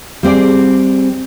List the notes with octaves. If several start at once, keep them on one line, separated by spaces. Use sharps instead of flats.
G3 C4 G#4 D5